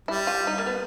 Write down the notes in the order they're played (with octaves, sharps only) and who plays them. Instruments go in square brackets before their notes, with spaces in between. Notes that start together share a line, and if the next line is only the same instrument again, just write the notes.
[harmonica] G3 [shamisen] E4
[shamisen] F4
D#4
A#3
B3